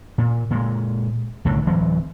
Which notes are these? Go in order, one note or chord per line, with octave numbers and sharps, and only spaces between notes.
A#2
A#2 G#3
C2 A2 D3 D#3
D1 E3 F#3 C4